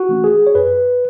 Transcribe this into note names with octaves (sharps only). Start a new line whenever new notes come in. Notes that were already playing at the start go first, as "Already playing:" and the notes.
Already playing: F#4
E3 A3 C#4
G#4
C#5
F#2 B4